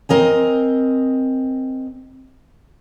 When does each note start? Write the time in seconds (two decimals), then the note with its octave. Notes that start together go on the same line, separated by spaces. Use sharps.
0.09 C4 A#4 D#5 G#5